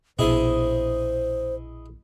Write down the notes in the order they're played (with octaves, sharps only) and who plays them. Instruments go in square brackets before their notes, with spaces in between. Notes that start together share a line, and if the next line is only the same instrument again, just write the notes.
[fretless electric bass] A#1 B2 [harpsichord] E4 G#4 D#5 [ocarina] C5